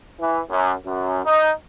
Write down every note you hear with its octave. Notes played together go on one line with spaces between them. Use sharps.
E3
F#2
F#2
D#4